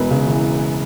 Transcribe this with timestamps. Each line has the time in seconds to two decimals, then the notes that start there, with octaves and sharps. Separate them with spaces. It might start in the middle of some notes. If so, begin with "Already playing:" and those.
Already playing: E1 E2 B4
0.11 C#3
0.27 E3